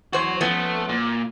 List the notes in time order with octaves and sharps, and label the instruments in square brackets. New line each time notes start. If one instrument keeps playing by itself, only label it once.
[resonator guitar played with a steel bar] E2 C5 [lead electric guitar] F#4 C#5
[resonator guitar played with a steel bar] F3 B3 C#4 [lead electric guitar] A3
[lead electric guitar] A#2